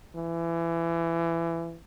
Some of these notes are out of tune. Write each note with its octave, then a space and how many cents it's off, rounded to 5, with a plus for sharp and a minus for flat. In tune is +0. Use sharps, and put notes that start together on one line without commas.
E3 +25